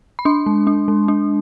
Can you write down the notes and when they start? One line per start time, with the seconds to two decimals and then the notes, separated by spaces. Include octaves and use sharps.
0.19 B5
0.25 D4 C6
0.46 G#3
0.67 D4
0.88 G#3
1.08 D4